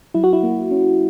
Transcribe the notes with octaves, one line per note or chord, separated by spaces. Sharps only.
F#3 E4
F#4
E4
A#3
C#4